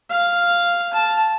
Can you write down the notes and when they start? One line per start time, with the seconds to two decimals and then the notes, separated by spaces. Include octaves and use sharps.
0.10 F5
0.94 A5